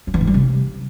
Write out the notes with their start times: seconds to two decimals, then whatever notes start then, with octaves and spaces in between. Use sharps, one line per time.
0.07 F3
0.14 E3
0.21 G#2
0.27 G3
0.34 C3